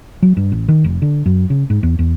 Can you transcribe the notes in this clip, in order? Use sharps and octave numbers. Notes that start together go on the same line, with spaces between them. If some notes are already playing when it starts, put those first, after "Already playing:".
F#3
G2
A1
D#3
F1
D3
F#2
C#3
G#2
E2
E2